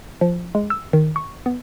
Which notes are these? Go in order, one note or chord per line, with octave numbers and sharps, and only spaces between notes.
F3
G#3
E6
D#3
C#6
B3